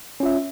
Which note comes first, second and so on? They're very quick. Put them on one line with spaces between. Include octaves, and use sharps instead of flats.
C#4 F4 E5